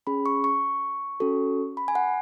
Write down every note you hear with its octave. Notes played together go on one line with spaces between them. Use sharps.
C#4 G#4 B5
C#6
C#6
C#4 F#4 A4
B5
G#5
F#5